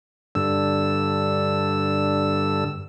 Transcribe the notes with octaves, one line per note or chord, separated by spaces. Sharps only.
G2 D3 E6